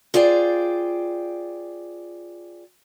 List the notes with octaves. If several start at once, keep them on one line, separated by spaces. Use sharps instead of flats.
F4 G#4 C5 D5 G5